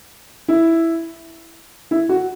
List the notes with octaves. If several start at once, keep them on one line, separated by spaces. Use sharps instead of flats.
E4
E4
F#4